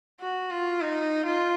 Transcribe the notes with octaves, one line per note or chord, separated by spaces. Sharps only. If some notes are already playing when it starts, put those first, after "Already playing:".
F#4
F4
D#4
F4